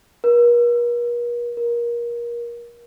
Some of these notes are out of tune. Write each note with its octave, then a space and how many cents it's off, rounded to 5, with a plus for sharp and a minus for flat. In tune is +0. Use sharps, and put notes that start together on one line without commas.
A#4 +45
A#4 +25